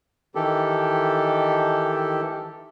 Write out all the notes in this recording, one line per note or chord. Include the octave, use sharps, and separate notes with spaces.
D#3 E3 G4 A4